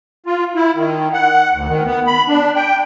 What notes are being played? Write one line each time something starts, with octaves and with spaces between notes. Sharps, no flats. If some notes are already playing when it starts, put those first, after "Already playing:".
F4
E4
D#3
F#5
D2
D#3
B3
B5
D4
G5